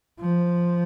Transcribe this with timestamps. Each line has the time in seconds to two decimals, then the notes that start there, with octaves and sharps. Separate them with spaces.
0.20 F3